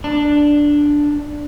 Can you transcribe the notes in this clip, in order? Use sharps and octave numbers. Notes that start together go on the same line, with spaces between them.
D4